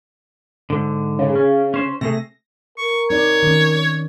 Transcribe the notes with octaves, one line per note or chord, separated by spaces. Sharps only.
G#2 D3
C#3
C#4
C#4 C5
C3 A3 G#4 A#6
A#4 C#6
C4 D#4 C#5 D5
D#3 C4 C#4